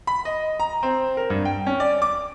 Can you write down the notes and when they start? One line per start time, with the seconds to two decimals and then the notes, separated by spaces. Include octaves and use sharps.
0.07 B5
0.25 D#5
0.60 A#5
0.83 C4
1.17 A#4
1.30 G2
1.45 G5
1.67 C#4
1.80 D5
2.02 D6